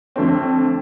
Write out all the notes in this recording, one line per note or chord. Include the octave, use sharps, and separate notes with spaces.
F2 D3 A3 C4